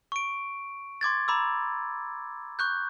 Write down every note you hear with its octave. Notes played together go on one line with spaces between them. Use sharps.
C#6 D7
C6 D6 G#6 A6
A#5 B5 D6 E6
C#6 F#6 G6